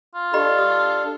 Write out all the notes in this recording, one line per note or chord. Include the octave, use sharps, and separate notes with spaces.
F4
D4 G4 A4 D#5 B5
G4 D#6